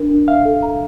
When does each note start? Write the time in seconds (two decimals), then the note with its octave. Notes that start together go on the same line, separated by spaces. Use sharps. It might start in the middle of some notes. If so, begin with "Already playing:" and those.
Already playing: D4 A#4
0.10 D4
0.28 E5 F5
0.45 A4
0.62 A#5